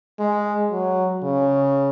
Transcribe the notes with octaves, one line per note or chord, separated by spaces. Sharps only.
G#3
F#3
C#3